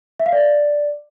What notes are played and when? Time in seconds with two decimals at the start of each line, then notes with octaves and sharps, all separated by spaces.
0.20 E5
0.26 F5
0.32 D5